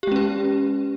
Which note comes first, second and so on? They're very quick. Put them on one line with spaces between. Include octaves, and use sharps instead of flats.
G4 G#3 C#4 B4